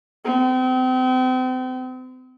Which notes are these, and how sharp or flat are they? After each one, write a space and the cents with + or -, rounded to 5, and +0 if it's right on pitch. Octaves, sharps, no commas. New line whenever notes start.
C4 -35